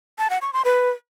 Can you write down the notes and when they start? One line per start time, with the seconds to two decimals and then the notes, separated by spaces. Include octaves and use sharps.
0.19 A5
0.30 F#5
0.42 C#6
0.53 C6
0.65 B4